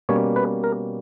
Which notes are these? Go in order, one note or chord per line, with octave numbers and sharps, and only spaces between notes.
B2 G3 A#3 C#4 C#5
B4
A#4